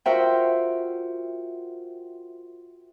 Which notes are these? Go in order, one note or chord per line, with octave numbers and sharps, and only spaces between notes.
F4 F#4 A#4 C5 E5 G5